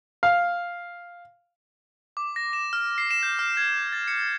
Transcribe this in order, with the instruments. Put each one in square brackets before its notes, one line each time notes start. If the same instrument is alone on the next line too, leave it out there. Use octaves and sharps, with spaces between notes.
[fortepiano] F5
[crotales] D6
A#6
E7
F6
C7
E7
G6
F6
G#6
A6
C#7